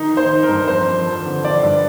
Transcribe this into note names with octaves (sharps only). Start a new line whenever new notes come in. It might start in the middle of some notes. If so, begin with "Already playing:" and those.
Already playing: D#3 D#4
D#3
C5
D#3
A#4
G2
F2 C5
F2
F3
D3
D3 D5
G2